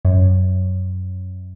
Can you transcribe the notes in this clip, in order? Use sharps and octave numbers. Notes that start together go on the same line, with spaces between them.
F#2